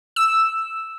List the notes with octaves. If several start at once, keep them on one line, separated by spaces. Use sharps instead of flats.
E6